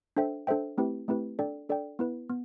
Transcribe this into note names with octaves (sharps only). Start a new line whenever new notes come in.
D4 A4 C5 E5 G5
D4 A4 C5 E5 G5
A3 C4 E4 G4 B4
A3 C4 E4 G4 B4
D4 A4 D5 G5
D4 A4 D5 G5
B3 E4 B4
B3